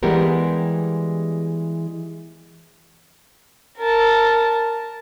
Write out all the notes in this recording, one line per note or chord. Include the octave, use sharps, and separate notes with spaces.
E3 G3 G#3 B3 G4 A#4
A#4 A5